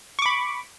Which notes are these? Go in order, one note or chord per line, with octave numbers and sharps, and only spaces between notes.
B5 C#6 D6